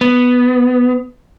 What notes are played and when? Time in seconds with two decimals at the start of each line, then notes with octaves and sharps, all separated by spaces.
0.01 B3